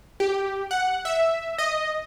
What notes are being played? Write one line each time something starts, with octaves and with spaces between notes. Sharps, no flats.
G4
F#5
E5
D#5